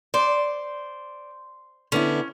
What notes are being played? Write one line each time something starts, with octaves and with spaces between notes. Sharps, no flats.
C5 D5
D3 B3 C#4 E4